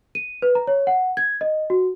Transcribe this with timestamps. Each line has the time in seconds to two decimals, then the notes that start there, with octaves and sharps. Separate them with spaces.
0.15 D#7
0.42 B4
0.55 A#5
0.67 C#5
0.87 F#5
1.17 G#6
1.41 D#5
1.70 F#4